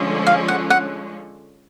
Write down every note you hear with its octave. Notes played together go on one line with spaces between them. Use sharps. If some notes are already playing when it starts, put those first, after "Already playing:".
Already playing: D3 F3 G#3 C#4
F5
F#5
F#5